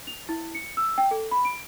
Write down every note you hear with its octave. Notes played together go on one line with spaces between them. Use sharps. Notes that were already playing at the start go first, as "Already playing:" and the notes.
F7
E4
C#7
E6
G5
A4
B5
D7